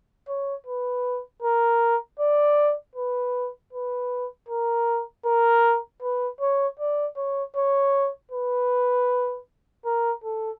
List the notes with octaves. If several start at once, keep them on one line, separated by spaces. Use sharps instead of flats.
C#5
B4
A#4
D5
B4
B4
A#4
A#4
B4
C#5
D5
C#5
C#5
B4
A#4
A4